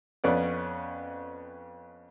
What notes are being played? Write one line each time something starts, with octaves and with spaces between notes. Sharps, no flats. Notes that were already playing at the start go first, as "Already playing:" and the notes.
F2 B3 C#4 D5